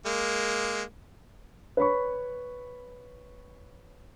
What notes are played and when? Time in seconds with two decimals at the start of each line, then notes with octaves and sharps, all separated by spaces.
0.06 G#3 A#3
1.77 B4 C#5 B5 C#6